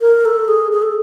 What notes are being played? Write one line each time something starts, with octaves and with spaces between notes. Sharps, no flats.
A#4
A4
G#4
G#4
A4